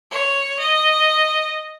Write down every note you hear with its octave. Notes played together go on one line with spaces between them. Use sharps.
C#5
D#5